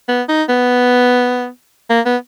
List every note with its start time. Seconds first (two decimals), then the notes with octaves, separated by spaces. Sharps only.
0.08 B3
0.29 D#4
0.49 B3
1.90 A#3
2.06 B3